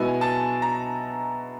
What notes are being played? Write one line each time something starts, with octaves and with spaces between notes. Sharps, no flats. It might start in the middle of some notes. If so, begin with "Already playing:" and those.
Already playing: B2 G#3 B3 E4 G#5
A5
A#5